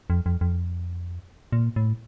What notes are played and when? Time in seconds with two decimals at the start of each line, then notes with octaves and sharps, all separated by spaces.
0.10 F2
0.26 F2
0.41 F2
1.52 A#2
1.76 A2